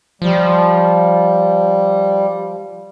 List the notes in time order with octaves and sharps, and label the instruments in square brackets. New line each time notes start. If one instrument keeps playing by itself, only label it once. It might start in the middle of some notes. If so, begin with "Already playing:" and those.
[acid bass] F3 [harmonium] G3